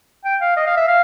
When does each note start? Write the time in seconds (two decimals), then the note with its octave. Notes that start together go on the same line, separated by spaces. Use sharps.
0.25 G5
0.41 F5
0.57 D#5
0.66 F5
0.77 E5
0.88 F5